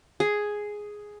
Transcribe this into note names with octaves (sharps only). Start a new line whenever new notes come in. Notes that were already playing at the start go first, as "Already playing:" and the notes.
G#4